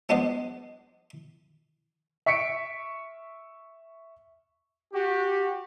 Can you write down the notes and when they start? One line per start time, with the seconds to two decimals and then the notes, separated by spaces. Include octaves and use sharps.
0.09 F3 G#3 B3 D4 C5 D#5
2.26 E5 C#6 B6 C#7 D7
4.93 F#4 G4